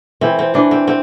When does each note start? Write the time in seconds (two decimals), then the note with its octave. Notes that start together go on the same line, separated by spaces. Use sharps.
0.21 E3 C4
0.39 C4
0.54 E3 D4
0.71 C4
0.88 C4